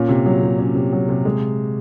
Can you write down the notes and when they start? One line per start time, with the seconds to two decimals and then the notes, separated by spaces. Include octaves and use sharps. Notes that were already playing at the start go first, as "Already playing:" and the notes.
Already playing: A#2 C#4
0.09 C3
0.26 F#3
0.43 C3
0.58 C#4
0.75 C3
0.92 F#3
1.09 C3
1.25 G#3